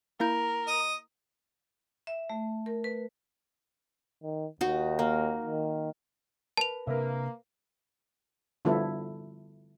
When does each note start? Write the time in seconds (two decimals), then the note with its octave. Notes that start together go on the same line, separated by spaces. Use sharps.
0.20 A#3 E4 A#4 G6
0.67 D#5 D#6
2.07 E5
2.30 A3
2.66 A#4
2.84 B4
4.23 D#3
4.61 D#2 D#4 F#4
4.99 A#3
5.46 D#3
6.57 A#4 B4 A5 F7
6.87 C3 A#3 D4 A#4 B4 E5
8.65 D3 F3 G3 B3 E4 A4